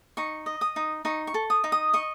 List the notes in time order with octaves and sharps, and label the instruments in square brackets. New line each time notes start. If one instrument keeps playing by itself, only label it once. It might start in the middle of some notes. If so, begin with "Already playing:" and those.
[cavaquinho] D#4 C#6
D#5
D#6
D#4
D#4 C#6
C#6
A4
D#6
D#4
D#6
D#5 C#6